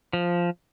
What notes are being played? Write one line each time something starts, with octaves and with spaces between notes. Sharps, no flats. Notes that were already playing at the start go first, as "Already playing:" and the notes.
F3